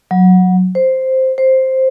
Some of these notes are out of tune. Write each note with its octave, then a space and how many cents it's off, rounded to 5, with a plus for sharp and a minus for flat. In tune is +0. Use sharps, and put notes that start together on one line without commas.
F#3 -10
C5 +0
C5 +5